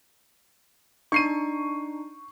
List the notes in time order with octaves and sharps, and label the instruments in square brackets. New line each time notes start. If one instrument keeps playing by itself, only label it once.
[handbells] D4 D#4 [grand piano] C#6 C7 D#7